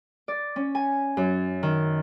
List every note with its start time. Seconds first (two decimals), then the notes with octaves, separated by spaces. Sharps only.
0.28 D5
0.56 C#4
0.75 G#5
1.17 F#2
1.63 D#3